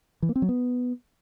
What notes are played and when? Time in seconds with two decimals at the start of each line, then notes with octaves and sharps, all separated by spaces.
0.22 E3
0.29 A#3
0.36 C4
0.42 F#3
0.49 B3